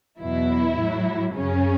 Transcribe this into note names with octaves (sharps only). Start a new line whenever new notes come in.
E2 B2 F#3 E4
A2 F#3
F#2 C#3 F#3 C#4